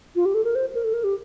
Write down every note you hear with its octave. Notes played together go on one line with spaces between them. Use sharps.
F4
G4
A4
A#4
C5
A#4
A4
A#4
G4